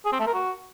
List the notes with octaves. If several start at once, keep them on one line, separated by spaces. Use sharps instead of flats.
G#4
C4
A3
A#4
F#4